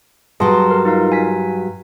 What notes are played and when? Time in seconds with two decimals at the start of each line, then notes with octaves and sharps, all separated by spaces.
0.40 G2 F#3 G#4 A5 C6
0.71 A#4
0.85 D#4 F4 F5
1.12 G#5 B6